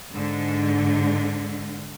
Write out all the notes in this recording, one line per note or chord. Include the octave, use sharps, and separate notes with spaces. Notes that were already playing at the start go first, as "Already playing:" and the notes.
G#2 D3